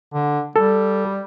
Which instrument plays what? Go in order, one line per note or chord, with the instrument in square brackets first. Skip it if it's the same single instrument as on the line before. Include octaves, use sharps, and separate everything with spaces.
[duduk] D3
[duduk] G3 [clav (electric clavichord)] A4